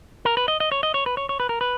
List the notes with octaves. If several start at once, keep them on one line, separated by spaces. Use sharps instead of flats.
A#4
B4
D#5
D#5
C#5
D#5
C#5
B4
C#5
C#5
B4
A#4
B4